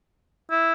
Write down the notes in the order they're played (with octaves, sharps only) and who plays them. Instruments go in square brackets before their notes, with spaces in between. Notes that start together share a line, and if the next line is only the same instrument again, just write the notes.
[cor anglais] E4